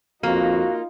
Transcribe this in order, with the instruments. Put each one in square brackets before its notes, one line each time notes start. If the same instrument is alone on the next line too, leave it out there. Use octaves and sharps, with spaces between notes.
[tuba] F2 [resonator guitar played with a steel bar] A#3 [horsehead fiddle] D#4 F4 [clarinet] F#4